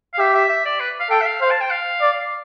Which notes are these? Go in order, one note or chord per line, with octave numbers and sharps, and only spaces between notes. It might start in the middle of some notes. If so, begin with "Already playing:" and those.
F5
G4 E5
E5
E5
D5
B4
F5
A4 G5
E5
F5
C5 F5
A5
G5
F5
D5